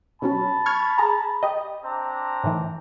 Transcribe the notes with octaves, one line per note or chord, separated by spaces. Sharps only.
B2 F#3 C#4 A5 B5
C#6 F6 G#6
G#4 A#5
G4 D#5
C4 D4 A#5
A2 D#3 E3